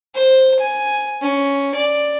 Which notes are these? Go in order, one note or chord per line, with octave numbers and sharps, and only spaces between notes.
C5
G#5
C#4
D5